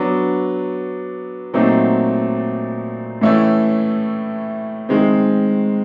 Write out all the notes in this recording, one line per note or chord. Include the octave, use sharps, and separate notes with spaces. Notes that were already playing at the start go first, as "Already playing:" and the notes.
Already playing: F#3 B3 D4
A#2 F#3 A3 C4 D#4
A2 E3 A3 C#4 E4
D#3 G#3 C4